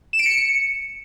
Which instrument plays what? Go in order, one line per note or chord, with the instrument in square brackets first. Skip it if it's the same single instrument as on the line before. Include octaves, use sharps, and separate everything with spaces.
[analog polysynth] E7
D7
C#7